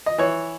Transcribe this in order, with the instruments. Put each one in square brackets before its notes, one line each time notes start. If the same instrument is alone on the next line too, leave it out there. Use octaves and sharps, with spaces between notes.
[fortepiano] D#5
E3 C#5